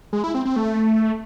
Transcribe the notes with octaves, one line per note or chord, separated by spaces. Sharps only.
G#3
E4
C4
C4
A3